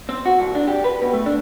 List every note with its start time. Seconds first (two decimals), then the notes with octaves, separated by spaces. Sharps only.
0.09 C4
0.26 F#4
0.39 C2
0.55 D4
0.68 G4
0.84 B4
1.02 B2
1.13 A3
1.26 D4